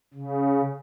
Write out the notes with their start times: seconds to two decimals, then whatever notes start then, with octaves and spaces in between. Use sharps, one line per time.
0.14 C#3